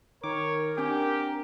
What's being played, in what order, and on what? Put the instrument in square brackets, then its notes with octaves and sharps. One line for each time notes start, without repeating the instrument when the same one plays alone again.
[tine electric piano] D#3 D6 [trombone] A#4 [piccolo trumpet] C#5
[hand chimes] C4 D4 G#5 [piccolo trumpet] G4 [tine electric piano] G5